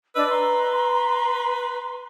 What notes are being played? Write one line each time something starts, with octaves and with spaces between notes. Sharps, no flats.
D4 B4 D#5 E6
A#5 C6